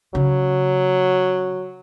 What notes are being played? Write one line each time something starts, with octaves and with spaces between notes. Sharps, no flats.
C#3 F#3